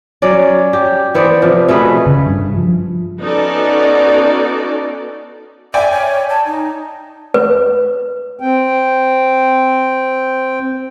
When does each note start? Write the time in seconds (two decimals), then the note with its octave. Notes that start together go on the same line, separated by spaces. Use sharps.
0.22 F#3 C#4 D5
0.73 G4
1.14 E3 B3 C5 D5
1.42 C3 F3
1.68 B2 A3 G#4 B4
2.07 C#3
2.26 G2
2.56 F3
3.20 B3 C#4 D#4 F#4 A4 D5
5.74 D5 E5 G5 G#5
5.91 C#5
6.30 A5
6.46 D#4
7.34 B4
8.40 C4 G5